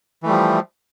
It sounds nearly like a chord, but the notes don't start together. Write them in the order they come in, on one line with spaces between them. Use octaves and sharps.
E3 A3 G3 F3